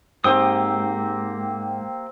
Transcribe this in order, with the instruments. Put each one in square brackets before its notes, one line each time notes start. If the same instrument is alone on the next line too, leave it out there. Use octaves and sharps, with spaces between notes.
[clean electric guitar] G#2 [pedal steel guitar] A#3 G4 D#6 [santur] C4 C5